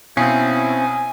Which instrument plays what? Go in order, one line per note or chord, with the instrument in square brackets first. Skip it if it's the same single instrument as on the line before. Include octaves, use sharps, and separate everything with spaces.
[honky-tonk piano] B2 F5 C7 [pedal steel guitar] C4 C#4 [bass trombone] E4 [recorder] G#5